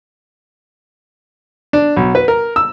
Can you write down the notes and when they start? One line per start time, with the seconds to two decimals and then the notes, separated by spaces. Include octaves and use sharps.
1.73 D4
1.96 B1
2.15 B4
2.28 A#4
2.56 E6